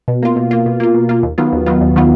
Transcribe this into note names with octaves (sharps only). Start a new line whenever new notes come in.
B2
A#3 F4
B2
A#3 F4
B2
A#3 F4
B2
A#3 F4
D#2
D#3 F#3 B3 F4
D#2
D#3 F#3 B3 F4
D#2
D#3 F#3 B3 F4